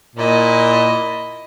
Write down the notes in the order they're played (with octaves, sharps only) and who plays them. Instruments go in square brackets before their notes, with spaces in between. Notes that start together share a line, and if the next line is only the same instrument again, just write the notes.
[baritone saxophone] A#2 [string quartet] E4 D#5